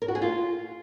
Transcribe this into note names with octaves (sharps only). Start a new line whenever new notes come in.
A#4
F#4
G#4
F4